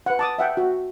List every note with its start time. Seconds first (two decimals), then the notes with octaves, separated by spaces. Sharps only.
0.06 B4 F#5
0.19 A5 D6 D#6
0.38 E5 F#5 G5
0.57 F#4